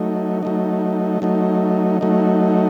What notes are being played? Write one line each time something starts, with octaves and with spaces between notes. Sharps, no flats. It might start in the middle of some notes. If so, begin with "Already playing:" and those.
Already playing: F#3 A3 D#4
F#3 A3 D#4
F#3 A3 D#4
F#3 A3 D#4